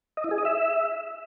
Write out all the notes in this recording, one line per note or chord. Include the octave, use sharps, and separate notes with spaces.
D#5
E4
G#4
D#5
E5